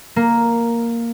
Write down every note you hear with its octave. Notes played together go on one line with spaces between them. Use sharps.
A#3